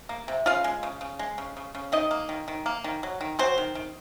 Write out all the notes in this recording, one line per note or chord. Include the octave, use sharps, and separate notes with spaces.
A#3
C3
C#3 F4 F5
G#3
C#3
C#3
G#3
C#3
C#3
C#3
D#3 D#4 D#5
A#3
D#3
D#3
A#3
D#3
F#3
D#3
F#3 C4 C5
D#3
D#3